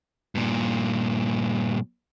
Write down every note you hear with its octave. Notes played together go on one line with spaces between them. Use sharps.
G2 A#2